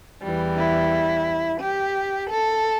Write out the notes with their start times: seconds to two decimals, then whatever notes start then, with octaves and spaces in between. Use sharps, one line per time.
0.23 E2 E3 G3
0.58 E4
1.61 G4
2.31 A4